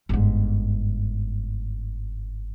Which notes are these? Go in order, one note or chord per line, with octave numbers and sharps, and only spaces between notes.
G1 G#2